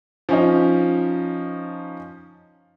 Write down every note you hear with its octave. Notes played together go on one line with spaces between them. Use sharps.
F3 C#4 D#4